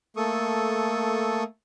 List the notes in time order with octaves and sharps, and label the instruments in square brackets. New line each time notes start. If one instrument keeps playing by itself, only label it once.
[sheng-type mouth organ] A3 A#3 A4 C#6 D#6